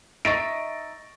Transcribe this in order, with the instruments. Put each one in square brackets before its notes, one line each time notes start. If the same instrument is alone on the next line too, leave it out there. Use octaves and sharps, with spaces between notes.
[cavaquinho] D#4 E5 [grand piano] C#6 A6 A#6 [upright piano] D7